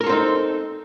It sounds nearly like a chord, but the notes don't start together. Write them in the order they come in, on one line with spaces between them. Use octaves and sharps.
A#4 A4 F4 C4 D#4